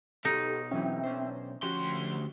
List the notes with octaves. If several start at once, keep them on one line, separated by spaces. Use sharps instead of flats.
B1 D#4 G4 A4
E3 F#3 C4 C#4 E5 G5
C#4 D4 C5
D2 F3 C#4 F#4 G4 C6